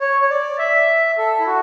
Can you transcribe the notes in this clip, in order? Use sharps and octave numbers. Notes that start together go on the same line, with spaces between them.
C#5
C#5
D5
E5
A4
E4
F#4